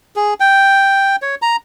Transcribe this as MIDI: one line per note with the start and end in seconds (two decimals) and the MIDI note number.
0.16 0.34 68
0.40 1.16 79
1.22 1.35 73
1.42 1.56 82